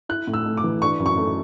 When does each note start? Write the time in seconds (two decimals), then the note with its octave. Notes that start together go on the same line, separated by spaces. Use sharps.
0.09 E4 F#6
0.27 A2
0.33 E6
0.45 A3
0.57 D6
0.63 E3
0.81 D4 C#6
0.99 F#2
1.06 C#6
1.17 A3